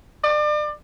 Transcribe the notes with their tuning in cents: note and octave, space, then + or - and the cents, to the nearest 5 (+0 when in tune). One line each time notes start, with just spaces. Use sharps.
D5 +35